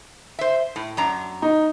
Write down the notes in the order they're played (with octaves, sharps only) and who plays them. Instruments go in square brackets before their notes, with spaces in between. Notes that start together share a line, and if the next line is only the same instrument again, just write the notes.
[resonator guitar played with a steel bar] C5 E5
A2
F#2 D4 A#5
[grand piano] D#4